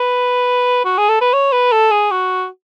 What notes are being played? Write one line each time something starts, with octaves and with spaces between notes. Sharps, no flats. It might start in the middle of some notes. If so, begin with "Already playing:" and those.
Already playing: B4
F#4
G#4
A4
B4
C#5
B4
A4
G#4
F#4